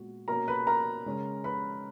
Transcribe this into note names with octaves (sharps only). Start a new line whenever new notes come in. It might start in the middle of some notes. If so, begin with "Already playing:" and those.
Already playing: A#2 G#3 B3 F#4
B2 A#3 C#4 A#4 A#5
B4 B5
A#4 A#5
C#3 G#3 C#4
B4 B5